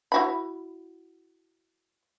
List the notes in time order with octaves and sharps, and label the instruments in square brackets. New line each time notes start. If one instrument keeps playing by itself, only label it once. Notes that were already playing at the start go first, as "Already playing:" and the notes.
[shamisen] E4 F#4 B5